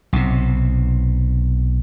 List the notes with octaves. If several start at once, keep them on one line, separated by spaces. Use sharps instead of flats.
B1 C3